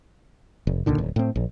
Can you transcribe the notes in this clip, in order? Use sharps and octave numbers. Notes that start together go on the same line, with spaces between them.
F1
C#2 A#2 D3 D#3
D1
A2 C4
A#1